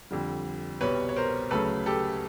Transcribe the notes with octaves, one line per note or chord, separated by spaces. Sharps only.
F2 D3 G3
C2 B2 G3 B4 C#5
C#5
A#4 C5
D2 C#3 F#3 A3 A4 B4
G4 A4